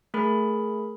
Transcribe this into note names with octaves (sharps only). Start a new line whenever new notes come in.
A3 G#4 A#4 B5